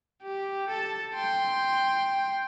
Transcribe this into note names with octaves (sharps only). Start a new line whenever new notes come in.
G4
A4 A5
G5 C6